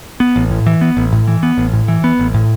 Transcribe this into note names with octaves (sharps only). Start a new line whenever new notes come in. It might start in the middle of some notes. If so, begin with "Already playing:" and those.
B3
A1
A2
E3
B3
A1
A2
E3
B3
A1
A2
E3
B3
A1
A2